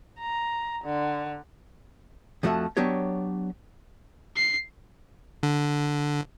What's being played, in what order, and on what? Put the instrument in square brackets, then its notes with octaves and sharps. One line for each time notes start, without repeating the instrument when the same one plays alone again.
[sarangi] A#5
D3
[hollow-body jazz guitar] F2 F3 A3 F#4 E5 F#5
F#3 B3 D4 G4 C#5
[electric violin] C7
[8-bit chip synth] D3